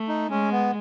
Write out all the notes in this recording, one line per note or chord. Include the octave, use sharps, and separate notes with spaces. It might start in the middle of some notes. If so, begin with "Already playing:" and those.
Already playing: A3
D#4
G#3 C#4
B3